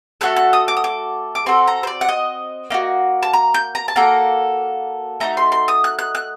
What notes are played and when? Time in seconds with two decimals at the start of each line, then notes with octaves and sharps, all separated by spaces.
0.21 A3 C4 F#4 A4 F#6
0.36 F#6
0.53 D#6
0.68 D6
0.77 D#6
0.84 D6
1.35 D6
1.46 C4 F#4 A4 C6
1.67 A#5
1.83 C5
1.87 D5
2.01 F#5
2.09 D#5
2.70 A#3 D#4 F#4
3.23 A5
3.33 A#5
3.54 G6
3.75 A#5
3.88 A5
3.96 A#3 F#4 A4 A#5
5.20 A3 D#4 F#4 A#5
5.37 C6
5.52 C6
5.68 D#6
5.84 F#6
5.99 F#6
6.15 F#6